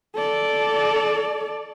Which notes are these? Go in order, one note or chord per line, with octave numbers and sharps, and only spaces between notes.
A4 D5